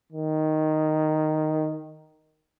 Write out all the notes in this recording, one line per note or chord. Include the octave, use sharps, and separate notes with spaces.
D#3